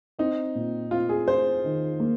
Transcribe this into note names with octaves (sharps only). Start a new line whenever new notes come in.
C4 D#4
A#2
C4 F4
G#4
F4 C5
D#3
A#3